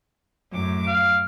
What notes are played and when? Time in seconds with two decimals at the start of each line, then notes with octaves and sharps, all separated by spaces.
0.51 F#2 A2 D6
0.87 F5